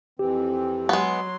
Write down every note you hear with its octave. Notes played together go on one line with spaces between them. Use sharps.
F2 E3 C4 G4
F#3 G#3 B3 C6